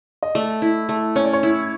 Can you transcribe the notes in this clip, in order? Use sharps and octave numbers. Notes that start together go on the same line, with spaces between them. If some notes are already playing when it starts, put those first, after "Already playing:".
D#5
A3 D5
E4
A3
C#4 C#5
D5
C#5
E4